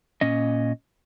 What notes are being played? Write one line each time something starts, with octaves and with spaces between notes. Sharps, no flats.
A#2 C#4 D#5